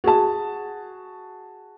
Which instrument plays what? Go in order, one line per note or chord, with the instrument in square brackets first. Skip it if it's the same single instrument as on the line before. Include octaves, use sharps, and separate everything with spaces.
[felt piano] F#4 G#4 A5